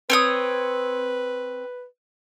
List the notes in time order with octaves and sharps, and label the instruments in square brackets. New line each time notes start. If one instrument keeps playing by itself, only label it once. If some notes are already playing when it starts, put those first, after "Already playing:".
[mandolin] C4 C#5 D#6 [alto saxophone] B4